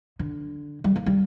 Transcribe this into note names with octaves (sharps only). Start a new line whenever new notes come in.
D3
G3
A#3
G3